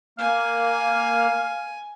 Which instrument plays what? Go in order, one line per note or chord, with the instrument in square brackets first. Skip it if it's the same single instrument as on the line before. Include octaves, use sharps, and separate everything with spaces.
[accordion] A#3 [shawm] F5 [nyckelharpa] G#5